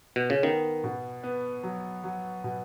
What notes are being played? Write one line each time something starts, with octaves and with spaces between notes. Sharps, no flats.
B2
C#3
D#3 B3
B2
B3
F#3
F#3
B2